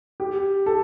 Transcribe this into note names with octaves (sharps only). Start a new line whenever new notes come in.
G4
A4